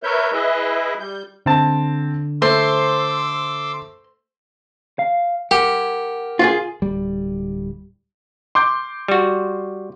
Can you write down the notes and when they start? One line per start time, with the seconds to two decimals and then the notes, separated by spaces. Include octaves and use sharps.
0.03 A#4 B4 C#5 E5 G6
0.32 E4 G#4 B4 D#5 E5
0.99 G3 G6
1.46 D3 C4 A5
2.42 A3 C5 C6 D6 E6
4.99 F5
5.51 G4 A#4 F#5
6.39 F4 F#4 G#4
6.82 D1 G3
8.55 C6 D6 G6
9.08 G3 F#4